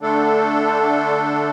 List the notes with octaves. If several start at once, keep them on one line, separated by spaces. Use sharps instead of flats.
D3 A3 D4 A4